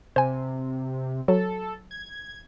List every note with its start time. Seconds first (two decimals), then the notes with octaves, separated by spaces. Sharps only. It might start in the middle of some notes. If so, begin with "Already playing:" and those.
0.16 C3 C5 G#5
1.28 F#3 A4
1.91 G#6